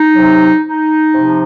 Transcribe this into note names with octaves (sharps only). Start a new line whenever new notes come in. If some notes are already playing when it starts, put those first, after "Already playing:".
Already playing: D#4
C3 F#3
D#4
C3 F3